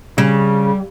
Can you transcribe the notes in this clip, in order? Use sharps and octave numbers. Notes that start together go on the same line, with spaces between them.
C#3 G3